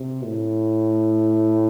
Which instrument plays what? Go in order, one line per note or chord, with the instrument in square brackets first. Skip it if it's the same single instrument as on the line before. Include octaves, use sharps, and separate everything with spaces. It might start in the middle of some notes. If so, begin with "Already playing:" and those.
Already playing: [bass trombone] C3
A2